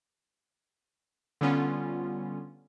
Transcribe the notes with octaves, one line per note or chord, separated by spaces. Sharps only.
D3 G3 B3 C#4 F4